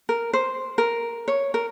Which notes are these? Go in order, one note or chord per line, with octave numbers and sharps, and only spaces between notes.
A#4
C5
A#4
C#5
A#4